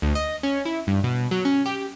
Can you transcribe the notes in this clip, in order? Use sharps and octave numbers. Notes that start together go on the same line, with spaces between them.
D2
D#5
C#4
E4
G2
B2
F#3
C#4
G4